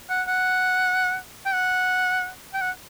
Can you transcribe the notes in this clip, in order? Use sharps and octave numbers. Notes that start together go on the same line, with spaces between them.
F#5
F#5
G5
F#5
G5
F#5